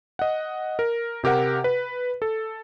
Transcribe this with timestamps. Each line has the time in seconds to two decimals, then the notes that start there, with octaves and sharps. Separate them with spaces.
0.19 D#5 F#5
0.79 A#4
1.24 C3 G4 A#4 F#5
1.64 B4
2.22 A4